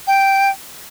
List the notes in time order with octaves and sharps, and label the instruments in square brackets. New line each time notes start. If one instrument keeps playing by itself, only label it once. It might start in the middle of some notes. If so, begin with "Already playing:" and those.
[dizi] G5